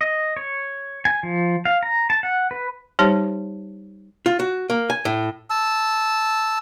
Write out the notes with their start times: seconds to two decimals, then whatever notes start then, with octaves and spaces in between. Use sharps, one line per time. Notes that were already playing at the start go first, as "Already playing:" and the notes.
0.01 D#5
0.37 C#5
1.05 G#5
1.23 F3
1.65 F5
1.83 A#5
2.10 A5
2.23 F#5
2.51 B4
2.99 G3 D#4 G4 C5 C#5 A5
4.26 F4
4.40 F#4
4.70 A#3
4.90 G#5
5.05 A2
5.50 A5 E6